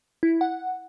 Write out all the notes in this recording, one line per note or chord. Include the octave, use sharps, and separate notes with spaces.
E4
F#5